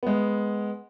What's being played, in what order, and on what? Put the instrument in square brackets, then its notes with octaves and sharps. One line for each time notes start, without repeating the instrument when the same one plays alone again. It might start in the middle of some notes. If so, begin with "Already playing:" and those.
[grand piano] G#3 B3